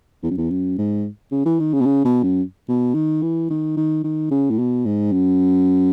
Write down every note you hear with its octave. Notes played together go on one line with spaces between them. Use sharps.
E2
F#2
E2
F#2
G#2
C#3
E3
D#3
C#3
B2
C#3
B2
F#2
B2
D#3
E3
D#3
D#3
D#3
C#3
A2
B2
G#2
F#2